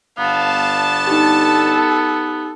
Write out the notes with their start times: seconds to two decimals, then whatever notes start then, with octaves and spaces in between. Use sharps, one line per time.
0.19 G1 B3 D4 F5 A5
1.07 D#4 G4 A4